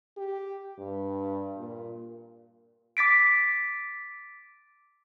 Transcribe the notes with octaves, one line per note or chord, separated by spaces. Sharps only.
G4
G2
A#2
D6 A6 B6 D7